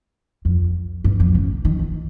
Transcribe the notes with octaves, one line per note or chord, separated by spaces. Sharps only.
F2
G2
F2
C#3
D#3
D#3